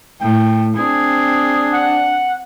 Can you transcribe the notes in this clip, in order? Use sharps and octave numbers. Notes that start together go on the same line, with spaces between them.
A2 G5
C4 D4 G#4
F#5